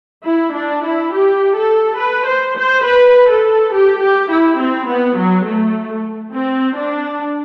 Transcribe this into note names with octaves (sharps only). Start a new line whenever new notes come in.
E4
D4
E4
G4
A4
B4
C5
C5
B4
A4
G4
G4
E4
C4
B3
F#3
A3
C4
D4